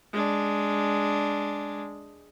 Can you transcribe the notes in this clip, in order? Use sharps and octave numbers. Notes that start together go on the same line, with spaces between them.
G#3 D4